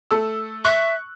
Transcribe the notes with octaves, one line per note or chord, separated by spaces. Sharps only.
A3 A4 E6
E5 C#6 F#6